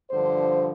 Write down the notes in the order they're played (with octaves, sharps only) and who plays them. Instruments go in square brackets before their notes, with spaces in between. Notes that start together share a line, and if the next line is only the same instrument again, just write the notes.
[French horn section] G2 D3 F3 C5